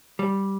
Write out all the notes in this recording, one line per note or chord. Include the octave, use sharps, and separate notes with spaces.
G3